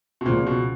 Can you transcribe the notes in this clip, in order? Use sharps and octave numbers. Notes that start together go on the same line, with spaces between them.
B2
C#2 A#2 C#3 F3 G#3 C4
B2